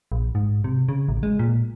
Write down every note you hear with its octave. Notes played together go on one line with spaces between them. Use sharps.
A#1
G#2
C3
C#3
A1
G#3
A#2